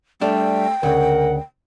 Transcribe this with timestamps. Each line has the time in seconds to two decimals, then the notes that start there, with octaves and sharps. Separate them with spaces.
0.21 G3 A3 D4 G5
0.83 D2 C#3 A#4 F#5